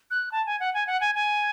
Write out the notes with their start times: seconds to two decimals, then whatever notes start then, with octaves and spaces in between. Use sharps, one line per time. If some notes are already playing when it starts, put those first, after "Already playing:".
0.11 F#6
0.32 A5
0.46 G#5
0.60 F#5
0.74 G#5
0.87 F#5
1.01 G#5
1.15 G#5